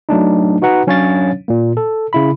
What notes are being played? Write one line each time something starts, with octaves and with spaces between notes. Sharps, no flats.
F#3 A3 D4 D#4
D#4 F#4 B4 F#5 A#5
F#3 C#4 D4 C#5 F5 A6
A#2 A#3
A4
C#3 E4 B5